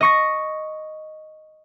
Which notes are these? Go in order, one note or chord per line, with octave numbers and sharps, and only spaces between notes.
D#5 C#6 A#6